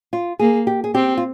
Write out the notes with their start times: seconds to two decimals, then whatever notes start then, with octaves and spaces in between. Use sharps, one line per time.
0.13 F4
0.39 A#3 G#4
0.67 G4
0.84 G#4
0.94 C4 G4
1.17 F4